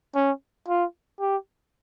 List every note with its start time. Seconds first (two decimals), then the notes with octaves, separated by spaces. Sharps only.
0.15 C#4
0.68 F4
1.20 G4